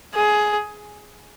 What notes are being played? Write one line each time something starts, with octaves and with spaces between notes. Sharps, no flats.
G#4